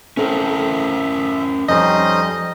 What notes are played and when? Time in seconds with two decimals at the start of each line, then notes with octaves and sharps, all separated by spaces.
0.17 C4 C#4 A4 A#4 C5 E5
1.68 F2 G3 C#4 D#4 C5 D#5